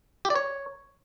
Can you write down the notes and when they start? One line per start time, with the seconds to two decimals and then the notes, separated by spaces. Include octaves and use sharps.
0.25 G4
0.30 D5
0.36 C#5